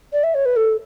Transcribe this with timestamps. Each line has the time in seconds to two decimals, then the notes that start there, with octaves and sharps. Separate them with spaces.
0.13 D5
0.23 E5
0.34 C#5
0.45 B4
0.56 A4